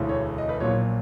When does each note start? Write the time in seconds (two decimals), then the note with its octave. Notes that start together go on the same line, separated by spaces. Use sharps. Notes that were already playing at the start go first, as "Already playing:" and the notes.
Already playing: E1 D2 C#3 E3
0.09 C#5
0.38 D#5
0.49 B4
0.60 A#1 A#2 F#3 C#5